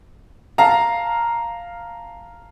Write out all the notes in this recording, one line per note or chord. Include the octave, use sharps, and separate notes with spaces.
F5 A5 A#5